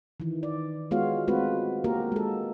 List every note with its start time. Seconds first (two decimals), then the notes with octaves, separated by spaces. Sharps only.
0.20 D#3 E3
0.43 D5
0.91 G#3 B3 F4 F#4 C#5 F5
1.28 G#3 A3 C4 F4 F#4 B4
1.84 A#3 F#4 G4 A#4
2.12 G#3 A4